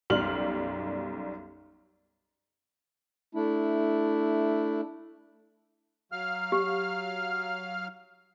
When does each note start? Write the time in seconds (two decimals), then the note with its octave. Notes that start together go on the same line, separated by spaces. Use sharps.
0.10 B1 F#2 G3 C6 F6 F#7
3.35 A3 D4 E4
6.12 F#3 F5 F6
6.52 G4